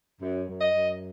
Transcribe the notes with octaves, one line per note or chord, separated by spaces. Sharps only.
F#2
F#2
D#5
F#2